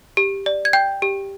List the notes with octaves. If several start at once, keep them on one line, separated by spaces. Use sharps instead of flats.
G4
D5
G#6
G5 G6
G4